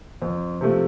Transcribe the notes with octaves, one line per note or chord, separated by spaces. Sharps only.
F2
C3 F3 A3